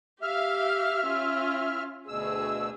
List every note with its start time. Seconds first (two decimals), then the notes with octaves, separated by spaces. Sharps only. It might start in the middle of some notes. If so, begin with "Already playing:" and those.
0.22 G4 E5 F5 F6
1.07 C#4 F4
2.08 D2 B2 G#4 E6